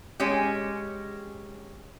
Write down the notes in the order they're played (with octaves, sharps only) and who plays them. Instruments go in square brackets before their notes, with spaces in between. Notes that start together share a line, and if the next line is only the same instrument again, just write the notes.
[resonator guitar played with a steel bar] G#3 C#4 G4